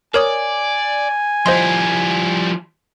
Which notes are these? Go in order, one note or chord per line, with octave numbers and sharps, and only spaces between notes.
A#4 C#5 D5 G#5 D#6
F3 G3 E4 F4 C5 D#5 C6